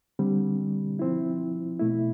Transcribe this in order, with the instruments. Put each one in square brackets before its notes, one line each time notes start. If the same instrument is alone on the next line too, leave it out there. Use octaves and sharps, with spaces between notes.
[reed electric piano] D3 G3 C4
F3 C4 E4
B2 A3 E4